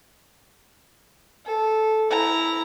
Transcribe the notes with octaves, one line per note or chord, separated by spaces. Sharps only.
A4
E4 A#5